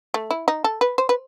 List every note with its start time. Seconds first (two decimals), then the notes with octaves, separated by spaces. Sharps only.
0.14 A3
0.31 E4
0.48 D#4
0.64 A4
0.81 B4
0.98 C5
1.09 B4